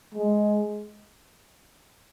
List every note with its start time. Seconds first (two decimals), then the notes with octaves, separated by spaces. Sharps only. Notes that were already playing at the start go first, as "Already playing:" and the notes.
0.14 G#3